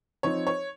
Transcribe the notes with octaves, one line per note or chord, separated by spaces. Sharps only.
F3 C4 D#4 C#5
C#5